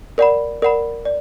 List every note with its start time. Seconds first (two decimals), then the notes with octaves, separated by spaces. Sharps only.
0.18 A#4 D5 F#5 B5
0.62 A#4 D5 F#5 B5
1.05 D5